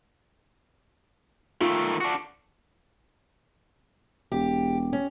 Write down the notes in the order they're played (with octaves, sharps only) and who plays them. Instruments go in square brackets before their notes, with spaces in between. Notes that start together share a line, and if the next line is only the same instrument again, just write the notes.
[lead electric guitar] D#3 A3 [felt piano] F4
[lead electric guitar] D4 F#4
[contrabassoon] E1 [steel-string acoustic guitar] G4
[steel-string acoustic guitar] C#4